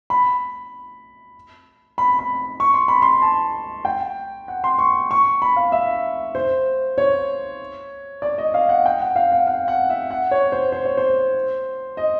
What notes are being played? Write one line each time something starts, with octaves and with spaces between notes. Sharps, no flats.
B5
B5
B5
C#6
C6
B5
C6
A5
G5
F#5
C6
C#6
C#6
B5
F5
E5
C5
C#5
D5
D#5
F5
F#5
G5
F#5
F5
F#5
F5
F#5
E5
F#5
C#5
C5
C5
C#5
C5
D#5